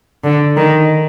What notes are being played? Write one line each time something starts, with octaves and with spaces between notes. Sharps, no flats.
D3
D#3